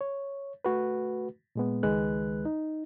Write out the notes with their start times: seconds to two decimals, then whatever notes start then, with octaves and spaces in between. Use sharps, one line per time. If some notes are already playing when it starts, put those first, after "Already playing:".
0.01 C#5
0.65 A3 F#4 B4
1.56 A#2 G#3 B3
1.83 C#2 D#3 G#3 B4 F#6
2.45 D#4